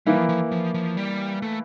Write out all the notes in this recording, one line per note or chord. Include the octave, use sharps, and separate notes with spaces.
E3 G3 A#3 E4
F3
F3
F3
F3
G3
A3